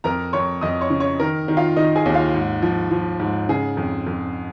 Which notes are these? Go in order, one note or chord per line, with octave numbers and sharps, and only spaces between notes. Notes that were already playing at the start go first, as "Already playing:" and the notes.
F2 A#4 A#5
F2 C#5 C#6
F2 D#5 D#6
C#5 C#6
C#3
C#5 C#6
D#3 A#4 A#5
D#3
F4 F5
D#3 D#4 D#5
G#4 G#5
D#2
F4 F5
G#2
F3
F3
G#2
C#3 G#4
F2
F2